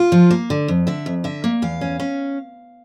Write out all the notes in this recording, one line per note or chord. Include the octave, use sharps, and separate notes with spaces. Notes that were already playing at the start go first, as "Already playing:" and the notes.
Already playing: F4
F3
A#3
D3
F2
D3 E5
F2
D3 E5
A#3
E2 F5
C#4
C#4